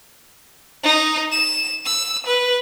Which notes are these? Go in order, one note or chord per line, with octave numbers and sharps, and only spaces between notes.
D#4
E7
E6
B4